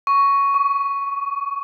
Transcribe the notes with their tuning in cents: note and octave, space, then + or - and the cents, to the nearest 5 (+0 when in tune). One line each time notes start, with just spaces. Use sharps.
C#6 +5
C#6 +40